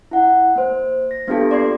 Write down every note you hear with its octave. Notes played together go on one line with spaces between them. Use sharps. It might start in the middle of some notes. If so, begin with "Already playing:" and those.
E4 F#5
A#3 C5
A#6
A#3 B3 D4 F4 G4 A4
D5 C6 G#6 C7